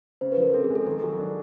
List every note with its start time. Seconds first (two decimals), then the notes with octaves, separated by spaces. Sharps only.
0.21 C#3 C5
0.32 B4
0.38 F3 A#4
0.54 C4 A4
0.64 G#4
0.70 G#3
0.75 A4
0.86 D#3 A4
1.03 F#3
1.19 D4